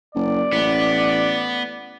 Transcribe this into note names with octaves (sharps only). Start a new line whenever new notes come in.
F#1 D5
A1 B3